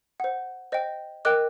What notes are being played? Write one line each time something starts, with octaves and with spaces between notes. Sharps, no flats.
C5 F#5
C5 D#5 G5
A#4 D#5 G5 D6 F#6